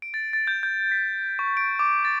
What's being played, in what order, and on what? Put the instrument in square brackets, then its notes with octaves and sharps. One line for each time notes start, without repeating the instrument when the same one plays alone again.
[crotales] D7
A6
A6
G6
G6
B6
C#6
D7
D6
A6